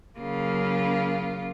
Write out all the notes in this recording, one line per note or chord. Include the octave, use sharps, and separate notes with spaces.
C#3 F#3 A#3 F4